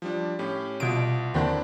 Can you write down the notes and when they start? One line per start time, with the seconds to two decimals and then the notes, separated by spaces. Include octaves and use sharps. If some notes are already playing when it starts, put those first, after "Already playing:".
0.02 F3 G3 D4
0.39 A2 C#4 G4
0.80 C2 B2 F4 D7
1.34 D#2 D3 D#3 C4 D4 E4